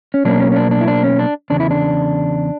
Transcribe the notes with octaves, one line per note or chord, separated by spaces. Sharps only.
C#4
B2 F#3 A#3 C#4 D4
C#4
C#4
D4
D4
E4
D4
C#4
D4
E2 C#3 D4
E4
D4